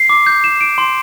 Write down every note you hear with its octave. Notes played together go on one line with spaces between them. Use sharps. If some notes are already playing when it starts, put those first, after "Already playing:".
Already playing: C7
D6
G6
E7
D7
C6